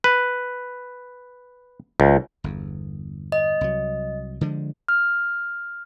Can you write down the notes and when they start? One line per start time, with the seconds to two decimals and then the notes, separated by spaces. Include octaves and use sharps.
0.04 B4
2.00 C#2
2.44 G1 E2
3.32 D#5
3.61 C2 F#3
4.41 D3 F3 G#3
4.88 F6